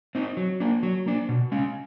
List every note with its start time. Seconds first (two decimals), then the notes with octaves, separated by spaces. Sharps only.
0.15 C4 D#4
0.37 F#3
0.60 A#3 D4
0.83 F#3
1.06 A#3 D4
1.29 B2
1.52 G#3 C#4